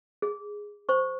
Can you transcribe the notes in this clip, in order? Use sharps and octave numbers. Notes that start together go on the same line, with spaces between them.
G#4
C5 C#6